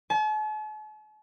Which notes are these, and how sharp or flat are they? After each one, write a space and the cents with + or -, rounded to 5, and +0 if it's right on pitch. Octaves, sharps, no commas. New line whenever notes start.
A5 -45